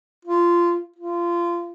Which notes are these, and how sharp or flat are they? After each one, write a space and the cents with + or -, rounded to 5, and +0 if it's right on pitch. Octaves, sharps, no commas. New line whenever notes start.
F4 -15
F4 -20